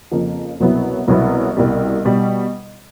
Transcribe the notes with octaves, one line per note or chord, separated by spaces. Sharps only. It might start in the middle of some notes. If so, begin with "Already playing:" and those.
F2 C#3 F3 A#3
C2 B2 F#3 B3 E4
C2 B2 F#3 B3 E4
C2 B2 G3
B2 G3